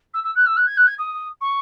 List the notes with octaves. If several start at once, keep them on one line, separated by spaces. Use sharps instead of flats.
E6
E6
F#6
E6
F#6
G#6
F#6
G#6
D#6
C#6